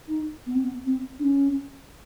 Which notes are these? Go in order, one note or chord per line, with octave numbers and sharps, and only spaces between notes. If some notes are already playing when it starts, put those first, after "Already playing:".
D#4
B3
C4
B3
C4
D4
C#4